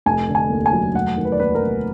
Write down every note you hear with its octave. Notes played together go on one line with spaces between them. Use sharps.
F1 G#5
D3
G#5
D#2
G#5
F#3
F1 F#5
D#3
B4
D5
D#2 B4
A#4
F1